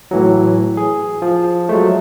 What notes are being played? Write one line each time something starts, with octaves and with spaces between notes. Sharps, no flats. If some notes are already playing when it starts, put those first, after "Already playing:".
A2 E3 F#3
G#4
F3
F#3 G#3 A3